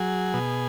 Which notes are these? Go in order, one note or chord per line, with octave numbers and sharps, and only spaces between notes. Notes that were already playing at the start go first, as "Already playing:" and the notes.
Already playing: F#3 G#4
B2